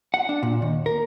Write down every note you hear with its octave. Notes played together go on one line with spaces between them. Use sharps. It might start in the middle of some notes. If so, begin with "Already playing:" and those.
F#5
D4
A#2
D#2
A#4